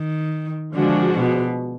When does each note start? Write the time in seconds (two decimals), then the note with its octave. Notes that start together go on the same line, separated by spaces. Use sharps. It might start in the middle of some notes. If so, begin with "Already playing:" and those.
Already playing: D#3
0.74 D3 F3 G#3 D4 F#4
1.14 B2